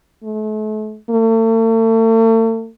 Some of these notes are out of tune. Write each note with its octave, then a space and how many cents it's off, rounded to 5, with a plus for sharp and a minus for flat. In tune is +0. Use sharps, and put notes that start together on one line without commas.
A3 -40
A3 +40